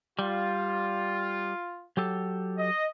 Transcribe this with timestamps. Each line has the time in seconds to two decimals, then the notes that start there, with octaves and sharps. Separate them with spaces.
0.19 G3 F4
1.97 F#3 G4 A4
2.57 D#5